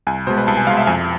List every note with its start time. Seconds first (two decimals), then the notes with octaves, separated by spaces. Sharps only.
0.07 C2 G#5
0.27 B2 C5
0.30 G#3
0.38 B4
0.47 C2 A5
0.57 G#5
0.67 B2 G#3 F5
0.77 E5
0.87 F2 G#5